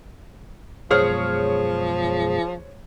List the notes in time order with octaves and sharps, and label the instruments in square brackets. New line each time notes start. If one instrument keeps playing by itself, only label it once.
[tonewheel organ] F#2 B2 G#3 [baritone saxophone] F3 [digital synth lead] G#4 [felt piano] C5 C#5 F6